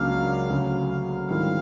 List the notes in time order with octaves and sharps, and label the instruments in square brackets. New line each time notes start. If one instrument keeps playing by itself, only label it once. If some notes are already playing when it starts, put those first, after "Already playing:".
Already playing: [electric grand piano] C#2 C#3 F#3 A#3 D4 [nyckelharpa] F5
[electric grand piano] D2 C#3 F#3
[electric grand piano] G#2 D#3 G3 C4 E4 [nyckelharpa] F5